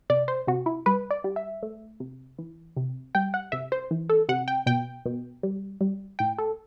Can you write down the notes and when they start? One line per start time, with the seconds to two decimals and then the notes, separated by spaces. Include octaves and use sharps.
0.10 C3 D5
0.28 C5
0.47 C3 F#4
0.66 E4
0.86 G3 B4
1.11 D5
1.24 G3
1.36 E5
1.63 A3
2.00 C3
2.38 E3
2.76 C3
3.15 G3 G5
3.34 F#5
3.52 C3 E5
3.72 C5
3.91 E3
4.09 A4
4.29 C3 F#5
4.48 G5
4.66 B2 G5
5.06 B2
5.43 G3
5.81 G3
6.19 A2 G5
6.38 A4